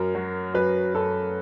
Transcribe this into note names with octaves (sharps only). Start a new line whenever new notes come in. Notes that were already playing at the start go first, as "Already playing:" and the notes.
Already playing: F#2 A#4
F#3
F#2 B4
F#2 A4